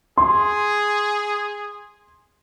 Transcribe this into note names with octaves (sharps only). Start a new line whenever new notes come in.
G#4 C6